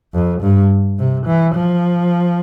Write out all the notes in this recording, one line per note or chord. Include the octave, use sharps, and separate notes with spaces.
F2
G2
C3
E3
F3